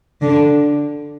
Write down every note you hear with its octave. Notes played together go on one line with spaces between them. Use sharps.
D3